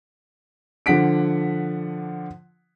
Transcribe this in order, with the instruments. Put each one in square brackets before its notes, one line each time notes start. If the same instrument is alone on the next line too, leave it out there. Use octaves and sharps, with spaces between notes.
[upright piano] D3 F3 D4 F#5 B6 D7